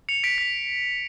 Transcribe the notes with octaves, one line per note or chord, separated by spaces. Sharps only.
C#7 F7
B6 D7
B6